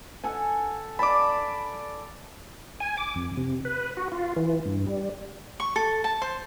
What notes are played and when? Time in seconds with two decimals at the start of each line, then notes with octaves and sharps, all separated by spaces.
0.23 A4 F#5 G#5
0.99 D5 A5 B5 D6
2.80 G#5
2.98 D6
3.15 F2
3.37 C3
3.65 B4
3.97 F#4
4.12 F4
4.36 E3
4.66 G2
4.87 G3
5.60 C#6
5.76 A4
6.04 A5
6.22 C5